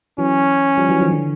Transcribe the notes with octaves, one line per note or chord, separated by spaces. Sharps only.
E3 F#3 C#4
F3 G3
E3 F#3
D#3 F3
D3 E3